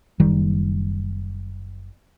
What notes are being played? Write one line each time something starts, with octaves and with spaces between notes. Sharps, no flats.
F#1 D#3 G3